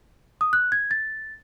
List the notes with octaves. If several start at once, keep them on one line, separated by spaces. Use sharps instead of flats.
D#6
F#6
G#6
A6